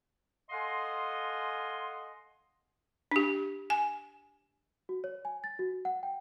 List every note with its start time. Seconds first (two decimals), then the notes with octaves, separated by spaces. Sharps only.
0.50 A4 D#5 F5 F#5 G#5 C6
3.11 D4 G4
3.70 G#5
4.89 F#4
5.04 C#5
5.25 G#5
5.44 A6
5.59 F#4
5.85 F#5
6.03 G5